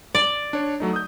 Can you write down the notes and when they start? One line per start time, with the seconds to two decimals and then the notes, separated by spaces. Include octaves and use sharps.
0.15 D5
0.53 D4 C#5
0.80 F#3 A3 D#4
0.93 D#6 G6